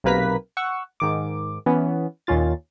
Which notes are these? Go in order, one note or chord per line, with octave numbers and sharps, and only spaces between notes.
B1 C3 A#3 B4 A#5 B6
F#5 C#6 E6
G#2 D#3 D6
E3 B3 C#4
D#2 A#2 C#4 F4 A6